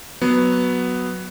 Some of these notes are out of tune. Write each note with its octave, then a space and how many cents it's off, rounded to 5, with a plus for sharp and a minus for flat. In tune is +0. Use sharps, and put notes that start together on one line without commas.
F#3 +0 B3 +0